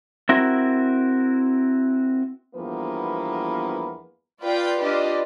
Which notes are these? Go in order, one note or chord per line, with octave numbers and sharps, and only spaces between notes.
C4 E4 F#4 A#4
E2 G2 F3 A#3 B3 B4
F4 B4 D5 F5 G5
D4 F4 G4 B4 D5 D#5